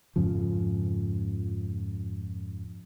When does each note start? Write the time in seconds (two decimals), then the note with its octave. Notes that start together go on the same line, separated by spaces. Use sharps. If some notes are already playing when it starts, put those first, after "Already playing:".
0.16 F2 G#2 C#3 F3